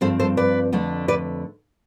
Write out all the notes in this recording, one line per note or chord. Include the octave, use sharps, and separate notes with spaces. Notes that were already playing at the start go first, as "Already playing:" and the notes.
G2 F3 C4 A4 C5
A4 C5
B4 D5
F2 D3 A3 D4
B4 D5